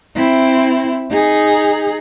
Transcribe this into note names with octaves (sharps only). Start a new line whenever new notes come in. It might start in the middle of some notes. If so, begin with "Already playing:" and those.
C4 E4
D#4 G#4